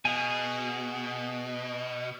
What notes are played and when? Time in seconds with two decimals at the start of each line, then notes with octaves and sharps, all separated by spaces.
0.05 B2 G#4 F5 G#5